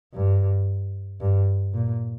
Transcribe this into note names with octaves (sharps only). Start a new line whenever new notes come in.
G2
G2
A#2